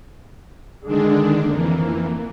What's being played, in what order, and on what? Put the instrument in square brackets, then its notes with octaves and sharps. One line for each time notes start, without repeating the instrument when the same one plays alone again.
[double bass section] D3 G#3 [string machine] D#3 D4
[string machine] F2 E3 [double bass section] A#3